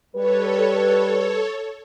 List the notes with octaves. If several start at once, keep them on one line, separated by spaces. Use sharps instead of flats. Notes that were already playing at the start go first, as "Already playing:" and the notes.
G3 A4 B4 C#5